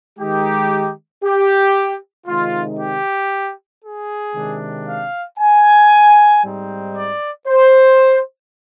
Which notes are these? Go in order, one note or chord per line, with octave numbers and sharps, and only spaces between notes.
D#3 G#3 D#4 G4
G4
C3 D#3 G#3 C4 D#4 F4
G4
G#4
C3 D#3 G#3 D4
F5
G#5
G#2 G3 C4 D#4
D5
C5